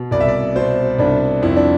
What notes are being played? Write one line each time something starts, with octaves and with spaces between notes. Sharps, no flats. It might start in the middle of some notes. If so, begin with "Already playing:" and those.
Already playing: B2
C2 D5
E5
D5
B2 C5
C2 D4
F2 E4
D4